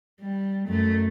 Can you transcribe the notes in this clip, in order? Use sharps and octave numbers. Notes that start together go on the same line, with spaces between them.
G3
F#2 A3